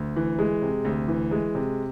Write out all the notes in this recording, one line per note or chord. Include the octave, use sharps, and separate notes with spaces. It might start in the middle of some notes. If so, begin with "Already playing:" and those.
Already playing: D2
E3
G#3
C3
D2
E3
G#3
C3